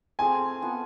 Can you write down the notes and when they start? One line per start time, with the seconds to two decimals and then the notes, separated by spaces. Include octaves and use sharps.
0.19 A3 C4 F4 G#4 G#5
0.62 B3 F4 A4